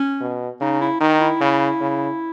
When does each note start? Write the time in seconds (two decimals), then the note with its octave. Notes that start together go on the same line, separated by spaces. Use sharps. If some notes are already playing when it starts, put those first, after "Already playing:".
Already playing: C#4
0.21 B2
0.61 C#3 D#4
0.81 E4
1.01 D#3 D#4
1.21 E4
1.41 C#3
1.81 C#3